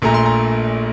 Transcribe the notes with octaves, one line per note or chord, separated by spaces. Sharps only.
A#1 A#2 A3 A#5
C6
A#5